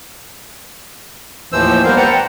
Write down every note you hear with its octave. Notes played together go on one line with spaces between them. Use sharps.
D#2 A2 E3 F3 C5 E6
G3 A#3 B3 A#4 C5 F5
B4 C5 F#5 G5 A5 A#5
G5